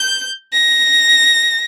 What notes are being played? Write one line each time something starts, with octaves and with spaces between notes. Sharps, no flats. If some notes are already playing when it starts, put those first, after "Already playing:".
Already playing: G6
A#6